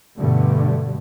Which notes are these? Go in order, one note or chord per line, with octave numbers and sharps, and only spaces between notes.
G2 B2 D3 A3